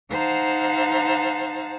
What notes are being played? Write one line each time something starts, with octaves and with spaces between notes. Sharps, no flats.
D#4 C5 F5 F#5 A5 A#5